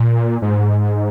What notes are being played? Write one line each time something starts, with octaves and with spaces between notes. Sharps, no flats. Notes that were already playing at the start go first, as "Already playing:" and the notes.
Already playing: A#2
G#2